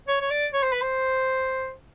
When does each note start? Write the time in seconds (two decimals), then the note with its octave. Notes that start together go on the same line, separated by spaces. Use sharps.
0.08 C#5
0.21 C#5
0.31 D5
0.53 C#5
0.63 C5
0.72 B4
0.82 C5